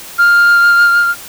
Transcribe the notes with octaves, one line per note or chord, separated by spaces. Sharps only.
F6